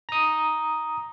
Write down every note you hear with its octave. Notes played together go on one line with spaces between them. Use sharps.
A#5 D#6